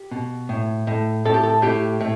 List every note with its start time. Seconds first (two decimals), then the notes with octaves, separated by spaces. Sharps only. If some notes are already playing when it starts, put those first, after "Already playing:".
Already playing: G4
0.11 B2
0.49 A2
0.87 A2
1.25 A2 A4
1.34 G4
1.43 A4
1.62 A2 G4
2.01 A2